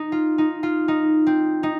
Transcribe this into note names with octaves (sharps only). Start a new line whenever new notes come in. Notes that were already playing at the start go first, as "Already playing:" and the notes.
Already playing: D#4
F4
D#4
F4
D#4
C4
D#4